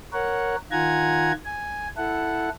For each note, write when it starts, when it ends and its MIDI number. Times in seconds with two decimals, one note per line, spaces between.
0.13 0.56 70
0.13 0.56 73
0.13 0.56 78
0.71 1.32 51
0.71 1.32 65
0.71 1.32 78
0.71 1.32 80
0.71 1.32 82
0.71 1.32 92
1.45 1.88 80
1.97 2.49 64
1.97 2.49 69
1.97 2.49 78